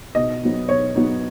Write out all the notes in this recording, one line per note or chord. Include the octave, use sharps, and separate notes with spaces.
B2 D#5
F#3 B3 D#4
B2 C#5
F#3 B3 D#4